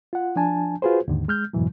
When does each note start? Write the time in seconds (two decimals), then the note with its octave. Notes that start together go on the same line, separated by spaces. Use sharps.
0.13 F4 F#5
0.36 F3 D4 G#5 A5
0.82 F4 F#4 G#4 B4 C5
1.08 D#2 G#2 D3 D#3
1.28 G#3 F6 G6
1.53 F2 G#2 B2 E3 F#3